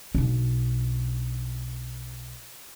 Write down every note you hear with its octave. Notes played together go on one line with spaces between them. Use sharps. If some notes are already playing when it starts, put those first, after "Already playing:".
B1 D4